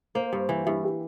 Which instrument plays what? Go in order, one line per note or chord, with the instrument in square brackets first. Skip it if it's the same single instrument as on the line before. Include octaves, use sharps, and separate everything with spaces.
[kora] A#3 [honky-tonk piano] C5
[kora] G2
E3
[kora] G2 [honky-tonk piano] E4
[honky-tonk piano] G4